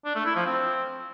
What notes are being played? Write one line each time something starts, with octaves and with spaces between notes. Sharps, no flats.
D4
A3
E4
F3
C4